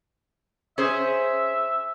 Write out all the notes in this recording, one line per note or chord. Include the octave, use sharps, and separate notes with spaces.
C#4 G#4 C5 E5